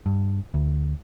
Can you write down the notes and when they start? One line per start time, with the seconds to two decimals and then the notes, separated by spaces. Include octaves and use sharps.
0.06 G2
0.54 D2